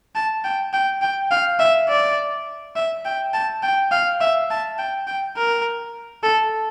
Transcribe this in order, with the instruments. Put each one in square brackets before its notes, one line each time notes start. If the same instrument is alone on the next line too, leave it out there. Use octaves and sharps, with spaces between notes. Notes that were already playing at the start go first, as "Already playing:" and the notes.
[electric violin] A5
G5
G5
G5
F5
E5
D5
E5
G5
A5
G5
F5
E5
A5
G5
G5
A#4
A4